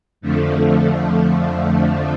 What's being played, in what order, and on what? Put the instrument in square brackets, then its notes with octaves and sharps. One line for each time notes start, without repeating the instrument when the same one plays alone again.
[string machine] F2 D3 F3 A3